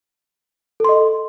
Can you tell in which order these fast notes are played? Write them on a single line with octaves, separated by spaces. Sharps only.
A4 C6 D#5